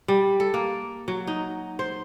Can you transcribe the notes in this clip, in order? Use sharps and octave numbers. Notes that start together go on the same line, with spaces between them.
G3
A4
A#3
F#3
D#4
C5